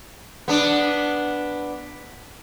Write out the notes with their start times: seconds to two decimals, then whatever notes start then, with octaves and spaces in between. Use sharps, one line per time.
0.48 B3 D4